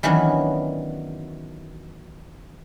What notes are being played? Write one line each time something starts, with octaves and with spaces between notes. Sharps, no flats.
D#3 E3 F#3 B3 C#4 D4